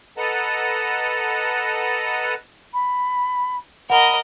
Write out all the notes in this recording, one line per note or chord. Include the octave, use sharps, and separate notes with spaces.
A4 B4 D#5 F#5 A5 A#5
B5
A#4 D#5 F#5 B5